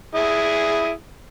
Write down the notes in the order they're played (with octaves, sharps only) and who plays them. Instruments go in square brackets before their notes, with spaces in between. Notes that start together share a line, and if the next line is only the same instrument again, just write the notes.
[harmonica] E4 G#4 D#6